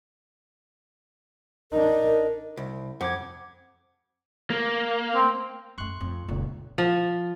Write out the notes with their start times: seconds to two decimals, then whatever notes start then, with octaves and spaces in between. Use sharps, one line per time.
1.72 D4 D#4 A#4
2.57 C2
3.01 F2 F#5 D6 G#6
4.50 A#3
5.15 C4
5.78 F#2 A3 C6 C#6 F#6
6.00 F2 D3
6.28 F1 C#2 A#2
6.78 F3